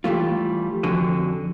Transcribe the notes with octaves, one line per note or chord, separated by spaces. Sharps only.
E3 G3 A3 F4
F2 D3 D4 F#4 G#5